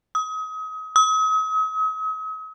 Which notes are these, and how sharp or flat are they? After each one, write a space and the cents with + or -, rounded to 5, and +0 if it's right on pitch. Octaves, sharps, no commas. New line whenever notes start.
D#6 +35
D#6 +45